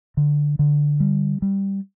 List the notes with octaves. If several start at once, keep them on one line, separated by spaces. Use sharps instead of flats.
D3
D3
G3
G3